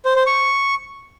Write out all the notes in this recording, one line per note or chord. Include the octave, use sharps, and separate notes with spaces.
C5
C5
C#6